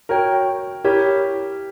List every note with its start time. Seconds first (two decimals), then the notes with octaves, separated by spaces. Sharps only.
0.09 F#4 A#4 C#5 G5
0.84 E4 G4 A#4 C#5